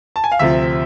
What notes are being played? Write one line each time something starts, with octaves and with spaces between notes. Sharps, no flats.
A5
G#5
F5
D2 C3 F3 E5